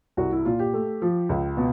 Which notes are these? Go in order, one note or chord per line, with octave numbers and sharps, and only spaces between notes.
C2 F#4
E4
A#2 F4
G4
A3
F3
C#2
B2